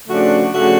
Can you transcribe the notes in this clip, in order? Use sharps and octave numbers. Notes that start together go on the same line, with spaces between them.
C#3 F3 A3 D4 F#4
C#3 F3 A3 D4 F#4